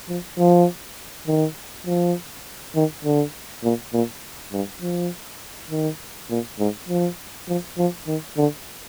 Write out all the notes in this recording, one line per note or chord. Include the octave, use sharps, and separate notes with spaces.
F3
F3
D#3
F3
D#3
D3
A#2
A#2
G2
F3
D#3
A#2
G#2
F3
F3
F3
D#3
D3